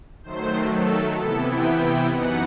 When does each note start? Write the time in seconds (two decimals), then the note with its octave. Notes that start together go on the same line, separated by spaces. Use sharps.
0.23 D#3 F#3 A3 C5
0.69 A4
1.17 C3 E3 B3 E4 A4
1.47 G5
1.77 G5
2.08 F#2 E3 B3 D#4 F#5